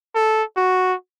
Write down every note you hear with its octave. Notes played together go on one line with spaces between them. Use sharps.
A4
F#4